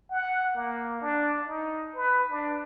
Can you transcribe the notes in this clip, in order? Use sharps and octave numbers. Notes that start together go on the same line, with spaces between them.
F#5
A#3
D4
D#4
B4
D4